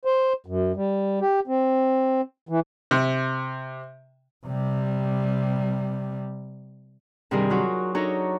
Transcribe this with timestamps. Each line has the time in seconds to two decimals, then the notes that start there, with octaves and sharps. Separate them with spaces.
0.05 C5
0.46 F#2
0.76 G3
1.21 G4
1.47 C4
2.49 E3
2.91 C3
4.46 C3 G3
7.31 G2 C3 D#3 G3 G#4 A#4
7.50 F#3 F4 F#4
7.95 D4 D#4 F#4 A4 C#5 A#5